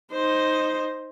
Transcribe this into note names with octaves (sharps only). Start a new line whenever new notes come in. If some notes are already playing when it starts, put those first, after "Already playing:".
D#4 C5